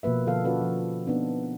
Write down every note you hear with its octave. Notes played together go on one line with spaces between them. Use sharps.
B2 F3 A#3 B4 E5
B2 D3 F3 A4 F5
C#4 F4 F#4 A4 B4 D5
F3
B3 C4 D4 D#4